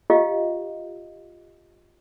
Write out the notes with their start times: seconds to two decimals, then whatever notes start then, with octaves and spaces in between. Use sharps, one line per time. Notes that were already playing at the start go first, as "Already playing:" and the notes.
0.10 F4 G4 D#5 F5